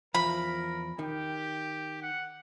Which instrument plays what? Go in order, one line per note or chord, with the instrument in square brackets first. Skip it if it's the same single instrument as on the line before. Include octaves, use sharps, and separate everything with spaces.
[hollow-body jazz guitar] E2 F3 [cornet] A#4 [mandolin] B5
[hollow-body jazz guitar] D#3 [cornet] G4
[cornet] F#5